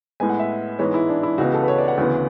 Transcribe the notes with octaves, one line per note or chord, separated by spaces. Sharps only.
A2 G#3 B3 G#5
F#5
E5
G#2 E3 G#3 B3 C#5
E4
D4
E4
C#2 C#3 E3 B3 F#4
A4
B4
C#5
D5
F#5
D2 C#3 E3 B3